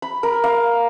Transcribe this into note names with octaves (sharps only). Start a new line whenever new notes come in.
B5
A#4
F5